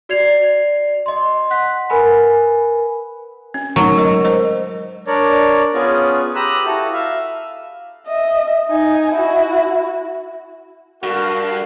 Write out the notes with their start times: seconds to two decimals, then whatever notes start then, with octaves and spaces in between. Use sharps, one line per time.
0.09 F#4 D5 G#6 C7 F7
1.06 D#5 C6
1.51 F#5 F#6 B6
1.90 A#4 B4 G#5 B5
3.54 C#4
3.76 F#3 A3 D#4 A#4
3.97 G#3 A#4 D#5
4.24 A#4 C5 D#5
5.07 D4 A#4 C#5 D5
5.74 B3 C#4 F4 G#4
6.35 G4 A#5 B5 D#6 E6 F#6
6.66 E4 F#4 A4
6.93 E5 F5
8.07 D#5 E5
8.69 D#4 G#5
9.14 E4 F#4
11.03 G2 F#4 A4 A#4 F5